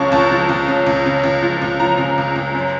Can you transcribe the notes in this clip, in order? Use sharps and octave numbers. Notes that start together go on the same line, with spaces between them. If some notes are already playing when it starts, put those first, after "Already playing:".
Already playing: C#2 C#3 F3 A5 C#6
C#2 A5
F3
C#2
C#3
C#2
C#3
C#2
F3
C#2
F3 A#5
C#3
C#2
C#2
F#2